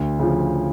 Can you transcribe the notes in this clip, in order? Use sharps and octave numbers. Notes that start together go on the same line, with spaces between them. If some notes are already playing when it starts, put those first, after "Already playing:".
Already playing: D2
C#3 F3